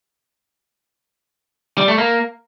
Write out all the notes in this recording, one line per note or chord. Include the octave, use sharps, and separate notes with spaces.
G3
A3
A#3